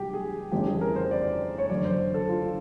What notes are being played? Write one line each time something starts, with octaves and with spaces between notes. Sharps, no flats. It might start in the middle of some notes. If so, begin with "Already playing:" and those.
Already playing: C2 B2 F#3 G4
G#4
G1 F2 C#3 E3 G4
G#4
A#4
C5
D5
C#5
F#1 F#2 D3 F#3 D5
C5
A4
F4